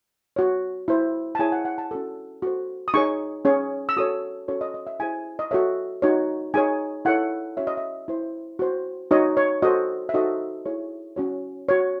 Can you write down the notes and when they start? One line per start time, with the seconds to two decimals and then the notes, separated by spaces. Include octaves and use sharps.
0.36 F#4 C#5
0.88 E4 C5
1.35 A5
1.39 E4 G#4 C#5 G#5
1.52 F#5
1.65 F#5
1.78 A5
1.91 C#4 F#4 A4
2.42 F#4 A4 C5
2.88 D#6
2.94 D#4 G#4 C#5 C#6
3.45 C#4 G#4 C#5
3.89 E6
3.97 F#4 A4 C#5 D#6
4.48 C#4 F#4 A4 C#5
4.61 D#5
4.74 D#5
4.87 E5
5.00 E4 G#4 C5 G#5
5.39 D#5
5.51 F#4 A4 C#5 E5
6.02 D#4 F#4 C#5
6.54 D#4 G#4 C#5 G#5
7.05 E4 A4 C#5 F#5
7.57 C#4 F#4 C#5 E5
7.67 D#5
7.77 E5
8.08 E4 C5
8.59 F#4 C5
9.11 D#4 F#4 C#5 D#5
9.37 C#5
9.62 F#4 A4 C5 D#5
10.09 E5
10.14 D#4 F#4 A4 C5 D#5
10.66 E4 G#4 C#5
11.16 C#4 F#4 C#5
11.69 F#4 C#5